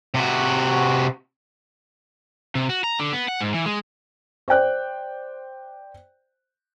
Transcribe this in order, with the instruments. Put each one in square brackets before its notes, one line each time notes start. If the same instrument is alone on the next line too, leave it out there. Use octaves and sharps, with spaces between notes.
[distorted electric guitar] C3 F#4
[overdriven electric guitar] C3
F#4
A#5
D3
B3
F#5
G#2
E3
G#3
[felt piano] C5 D5 G5 F#6